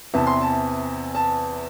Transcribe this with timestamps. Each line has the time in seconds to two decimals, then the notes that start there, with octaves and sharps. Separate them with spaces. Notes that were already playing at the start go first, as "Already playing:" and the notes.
0.14 E2 C3 E3 A5
0.27 C6
0.41 A5
1.15 A5